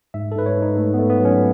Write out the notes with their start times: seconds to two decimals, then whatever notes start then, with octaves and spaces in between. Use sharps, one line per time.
0.14 G#2 E5
0.32 A4
0.35 G#2 B4
0.46 C#5
0.56 G#2
0.62 D#4
0.77 A3
0.94 B3
0.99 A3
1.10 B3
1.20 F#3
1.25 C#4